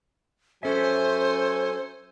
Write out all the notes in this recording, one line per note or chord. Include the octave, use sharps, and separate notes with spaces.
F#3 C#4 A4 C5 E5 G#5